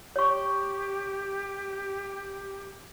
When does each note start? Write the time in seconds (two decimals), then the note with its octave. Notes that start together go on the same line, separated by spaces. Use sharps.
0.16 G4 C#5 C#6